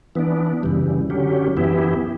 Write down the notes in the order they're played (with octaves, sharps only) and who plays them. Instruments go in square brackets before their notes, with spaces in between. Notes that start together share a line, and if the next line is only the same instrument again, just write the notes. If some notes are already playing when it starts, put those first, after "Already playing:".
[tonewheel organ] E3 B3 D4
F#2 C#3 E3 G3
D3 F#3 C#4 G4
F#2 E3 B3 E4 G4